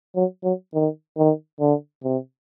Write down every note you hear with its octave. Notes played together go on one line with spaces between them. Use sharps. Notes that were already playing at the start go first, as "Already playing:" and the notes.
F#3
F#3
D#3
D#3
D3
C3